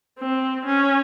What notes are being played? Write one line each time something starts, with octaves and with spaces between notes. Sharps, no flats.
C4
C#4